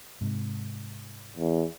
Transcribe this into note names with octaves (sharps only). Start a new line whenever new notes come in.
G#2 C3
E2